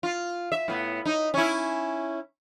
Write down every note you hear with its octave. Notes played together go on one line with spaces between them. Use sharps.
F4
E5
A2 B3
D#4
C#4 E4